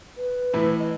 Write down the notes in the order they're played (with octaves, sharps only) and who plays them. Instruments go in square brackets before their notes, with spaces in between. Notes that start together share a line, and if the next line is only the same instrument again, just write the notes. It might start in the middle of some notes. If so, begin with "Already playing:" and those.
[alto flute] B4
[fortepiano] A2 E3 E4
[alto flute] D#5